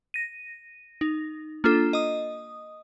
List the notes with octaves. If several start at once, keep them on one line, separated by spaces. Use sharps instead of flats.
A#6 D#7
D#4
A#3 D4 F4 A4
D#5 D#6